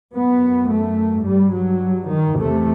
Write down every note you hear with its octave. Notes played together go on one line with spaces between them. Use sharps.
F#2 B3
A3
G2 G3
F#3
D#3
E2 C3 A3